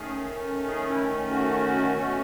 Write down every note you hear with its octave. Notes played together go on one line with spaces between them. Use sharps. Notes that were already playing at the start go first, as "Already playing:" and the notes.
Already playing: D#3 A3 C#4 G#4
G#4
E4
F#4
B2 A3 C#4